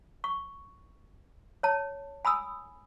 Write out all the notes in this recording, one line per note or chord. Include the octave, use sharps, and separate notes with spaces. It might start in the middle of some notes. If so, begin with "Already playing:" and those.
C#6
C#5 A5
G#5 B5 D#6 E6